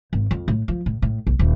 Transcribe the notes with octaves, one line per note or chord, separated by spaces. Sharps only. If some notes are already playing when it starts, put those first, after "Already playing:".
G#1
F2
A2
F3
A2
A2
B1
D#1